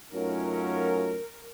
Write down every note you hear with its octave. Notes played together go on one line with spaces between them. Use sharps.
F#2 F#3 A3 C#4 D#4 F4 A#4